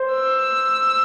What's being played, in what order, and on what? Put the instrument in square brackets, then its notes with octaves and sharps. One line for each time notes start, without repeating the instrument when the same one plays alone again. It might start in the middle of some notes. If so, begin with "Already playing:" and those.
Already playing: [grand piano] C5
[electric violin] E6